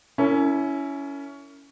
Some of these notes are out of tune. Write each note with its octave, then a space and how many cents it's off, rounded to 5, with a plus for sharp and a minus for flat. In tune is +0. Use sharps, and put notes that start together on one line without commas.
C#4 +20 E4 +0 A#4 -35